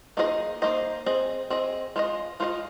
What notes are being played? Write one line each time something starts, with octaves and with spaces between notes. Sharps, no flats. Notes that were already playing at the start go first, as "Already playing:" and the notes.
A#3 D#4 G#4 C5 D#5
A#3 D#4 G#4 C5 D#5
C4 G#4 D#5
C4 G#4 D#5
G#3 F4 C5 D#5
G#3 F4 C5 D#5